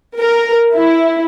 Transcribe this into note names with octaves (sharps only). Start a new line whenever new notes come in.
A#4
E4